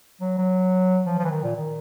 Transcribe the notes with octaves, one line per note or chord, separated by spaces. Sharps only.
F#3
F#3
F3
F3
E3
D#3
A#2
D#3